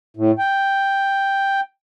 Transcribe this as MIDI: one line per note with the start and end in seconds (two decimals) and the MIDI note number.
0.17 0.31 45
0.38 1.60 79